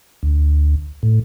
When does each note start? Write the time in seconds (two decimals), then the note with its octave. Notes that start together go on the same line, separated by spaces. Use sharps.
0.23 D2
1.03 A2